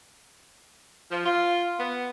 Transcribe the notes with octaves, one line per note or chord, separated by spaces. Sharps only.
F3
F4
B3